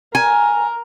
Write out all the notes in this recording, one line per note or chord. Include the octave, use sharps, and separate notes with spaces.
A#4 G#5